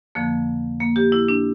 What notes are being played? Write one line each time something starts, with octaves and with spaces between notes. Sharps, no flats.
F2 D3 F3 A#3
A#3
G4
E4
D4